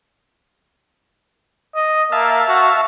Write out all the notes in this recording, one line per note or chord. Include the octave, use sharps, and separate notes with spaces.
D#5
A#3 E5 F5 A5
F#4